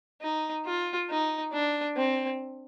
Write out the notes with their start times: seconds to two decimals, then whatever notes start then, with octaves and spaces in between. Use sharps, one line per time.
0.21 D#4
0.65 F4
1.09 D#4
1.53 D4
1.96 C4